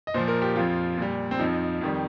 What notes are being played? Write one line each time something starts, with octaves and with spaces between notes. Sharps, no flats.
D#5
A#2 F3 C5
A#4
G4
F2 F3 F4
A#2 G3
C4
F2 F3 D#4
F2 D#3 G3